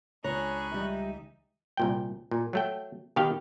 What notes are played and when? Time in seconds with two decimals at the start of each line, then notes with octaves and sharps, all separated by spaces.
0.24 C#2 D4 G#4 C#5 A#5 B5 C#6 F#6
0.72 E3 G3 D#4 E5
1.77 C2 A#2 G5
2.31 A#2
2.53 F#3 A3 G5
3.16 B2 D#3 G4 F5 G5